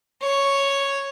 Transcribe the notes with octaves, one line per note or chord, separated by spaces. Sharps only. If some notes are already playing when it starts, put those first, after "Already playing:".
C#5